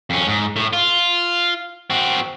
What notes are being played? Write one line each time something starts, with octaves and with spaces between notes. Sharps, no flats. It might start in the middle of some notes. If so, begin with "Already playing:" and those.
F2 C#4
G#2
A2
F4
C4 F#4